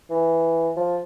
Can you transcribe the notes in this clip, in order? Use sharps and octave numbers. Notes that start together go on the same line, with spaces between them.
E3
F3